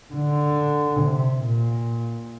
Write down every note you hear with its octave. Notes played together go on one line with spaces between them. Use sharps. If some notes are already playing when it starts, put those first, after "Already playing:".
D3
C3
A#2